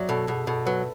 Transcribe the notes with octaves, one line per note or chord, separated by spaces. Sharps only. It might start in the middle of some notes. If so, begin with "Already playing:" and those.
Already playing: F#3 D5 E5
B2 A4
B2 G#4
B2 A4
F#3 B4